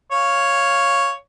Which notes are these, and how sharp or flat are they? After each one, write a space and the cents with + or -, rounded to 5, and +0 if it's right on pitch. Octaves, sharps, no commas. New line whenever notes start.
C#5 +0 F5 +0